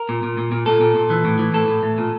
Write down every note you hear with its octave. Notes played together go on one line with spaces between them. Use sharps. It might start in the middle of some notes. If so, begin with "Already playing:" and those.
Already playing: A#4
A#2
A#2
A#2
A#2
A#2 A4
A#2
A#2
E3
A2
E3
A2 A4
A2
A2
A#2